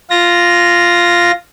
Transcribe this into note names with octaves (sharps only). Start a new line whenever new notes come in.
F4 A#6